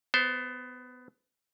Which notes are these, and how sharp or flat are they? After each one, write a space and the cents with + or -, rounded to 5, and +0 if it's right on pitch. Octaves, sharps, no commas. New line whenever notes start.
B3 +20 C5 +0